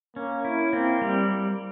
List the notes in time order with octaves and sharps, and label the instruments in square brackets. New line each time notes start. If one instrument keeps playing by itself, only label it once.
[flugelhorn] A#3 [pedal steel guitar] C#4
[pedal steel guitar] E4
[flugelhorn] A#3 [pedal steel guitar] C4
[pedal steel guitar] G3